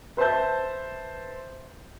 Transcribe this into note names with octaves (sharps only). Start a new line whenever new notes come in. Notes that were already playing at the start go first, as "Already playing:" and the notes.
B4 C5 E5 A5 G6